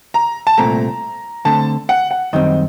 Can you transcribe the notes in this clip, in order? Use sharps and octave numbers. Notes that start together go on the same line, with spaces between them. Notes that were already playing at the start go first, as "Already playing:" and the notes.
A#5
A5
C2 A#2 A3 C4 A#5
D3 A3 C4 A5
F#5
F#5
F#2 D#3 G3 C4 D#5